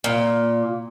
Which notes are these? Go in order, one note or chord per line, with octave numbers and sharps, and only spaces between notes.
A#2